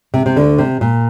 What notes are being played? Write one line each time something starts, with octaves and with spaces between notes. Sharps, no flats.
C3
C3
D2 D3
C3
A#2